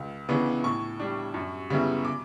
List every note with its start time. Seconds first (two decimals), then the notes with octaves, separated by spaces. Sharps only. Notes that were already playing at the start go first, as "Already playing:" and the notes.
Already playing: C#2
0.29 C#3 E3 B3 D4
0.64 A2 C#6
1.00 G3 D4
1.34 F#2
1.70 C#3 G3 B3 E4
2.05 D6